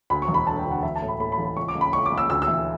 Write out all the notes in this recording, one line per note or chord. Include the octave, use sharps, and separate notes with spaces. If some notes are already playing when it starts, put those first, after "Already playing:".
D2 B5
C#6
E1
B5
D3 A5
G5
D2
F#5
E3 E5
A5
A2
B5
A2 B5
B5
A1
B5
C#2 C#6
D6
C#2
B5
C#2 C#6
D6
C#2
E6
D2 E6
E6
E3